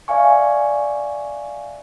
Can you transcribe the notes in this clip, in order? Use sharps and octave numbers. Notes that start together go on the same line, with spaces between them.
D5 E5 F5 G#5 C#6